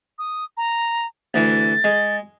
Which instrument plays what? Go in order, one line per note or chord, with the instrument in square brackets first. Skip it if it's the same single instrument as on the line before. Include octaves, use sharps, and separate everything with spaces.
[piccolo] D#6
A#5
[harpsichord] D2 E3 [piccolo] A6
[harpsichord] G#3